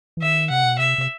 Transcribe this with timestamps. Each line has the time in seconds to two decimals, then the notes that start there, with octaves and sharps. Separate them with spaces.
0.17 E3
0.22 D#3 E5
0.50 C3 F#5
0.64 B2
0.79 C3 E5
0.98 C3